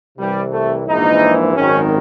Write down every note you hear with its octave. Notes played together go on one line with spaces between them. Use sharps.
C2 C3 E3 G3
A3
A#1 G#2 E3 D#4
G#1 F#2 D#3 C#4